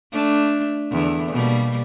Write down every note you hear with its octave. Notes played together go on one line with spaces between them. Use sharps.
A3 D4
E2 D3
B2 G3 A#3